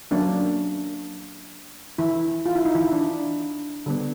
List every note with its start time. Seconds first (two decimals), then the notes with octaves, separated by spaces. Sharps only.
0.11 F#3 A#3 C#4 D4
1.98 E3 E4
2.46 F4
2.55 E4
2.65 D#4
2.75 E3 E4
2.92 D4
3.86 D3 G3 B3